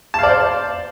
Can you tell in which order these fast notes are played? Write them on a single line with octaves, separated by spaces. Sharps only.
A5 F5 D5 C5